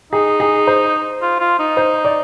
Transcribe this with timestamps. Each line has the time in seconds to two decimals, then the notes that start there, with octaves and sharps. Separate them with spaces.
0.13 D#4 G#4
0.40 G#4
0.67 C5
1.22 F4
1.40 F4
1.59 D#4
1.77 C5
2.05 D5